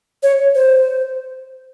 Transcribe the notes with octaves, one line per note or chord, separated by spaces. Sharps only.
C#5
C5